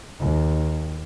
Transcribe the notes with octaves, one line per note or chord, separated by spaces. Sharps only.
D#2